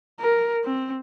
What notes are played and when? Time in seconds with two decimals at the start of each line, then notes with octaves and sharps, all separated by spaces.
0.20 A#4
0.64 C4